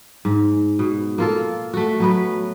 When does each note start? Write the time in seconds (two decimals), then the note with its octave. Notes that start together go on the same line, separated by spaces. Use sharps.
0.25 G#2
0.79 B2
1.18 A#3 F4 A4
1.73 A3 F#4
2.00 F#3 B3 B4